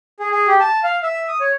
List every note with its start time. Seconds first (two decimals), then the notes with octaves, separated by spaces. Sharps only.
0.20 G#4
0.31 G#4
0.47 G4
0.60 A5
0.83 F5
1.03 E5
1.28 D#6
1.40 C#5